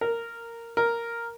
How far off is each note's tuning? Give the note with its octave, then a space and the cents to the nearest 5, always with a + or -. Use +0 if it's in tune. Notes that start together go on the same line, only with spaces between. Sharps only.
A#4 -10
A#4 +0